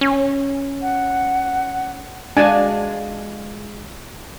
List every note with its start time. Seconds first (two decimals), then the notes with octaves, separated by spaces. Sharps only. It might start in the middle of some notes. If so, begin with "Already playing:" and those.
0.01 C#4
0.82 F#5
2.37 G#3 D4 F4 F#4 G#5 A5